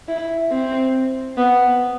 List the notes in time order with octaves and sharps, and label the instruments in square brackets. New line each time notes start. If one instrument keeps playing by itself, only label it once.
[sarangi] E4
C4
B3